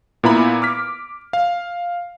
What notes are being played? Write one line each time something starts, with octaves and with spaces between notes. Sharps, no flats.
A#2 B3 E4 A#5 B5
D6 F6 B6
F5